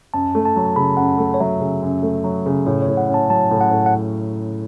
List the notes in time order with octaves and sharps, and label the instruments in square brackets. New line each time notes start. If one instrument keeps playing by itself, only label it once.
[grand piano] F#2 [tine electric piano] A5
[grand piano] A3
[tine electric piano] A5
[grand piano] F#3
[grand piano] C#3 [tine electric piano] B5
[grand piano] F#2 [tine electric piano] F#5
[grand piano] A3
[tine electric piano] C#5
[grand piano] F#3 [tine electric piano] E5
[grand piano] C#3
F#2
A3
F#3
C#3
[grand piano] A2 [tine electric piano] C#5
[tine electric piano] C#5
[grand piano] A2
[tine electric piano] F#5
[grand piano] C#4
[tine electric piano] A5
[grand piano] F#3 [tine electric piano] A5
[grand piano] A2
[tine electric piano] F#5
[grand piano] A2
[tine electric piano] F#5